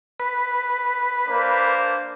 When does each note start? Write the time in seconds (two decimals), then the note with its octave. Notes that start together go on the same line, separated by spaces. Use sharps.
0.20 B4
1.29 A#3 D4 C5